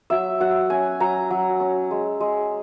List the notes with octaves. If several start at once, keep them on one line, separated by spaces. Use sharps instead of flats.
F#3 E5
F#3 F#5
C#4 G#5
F#3 A#5
F#3
C#4
G#3
G#3